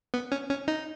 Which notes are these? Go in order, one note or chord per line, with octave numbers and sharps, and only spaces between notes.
B3
C#4
C#4
D#4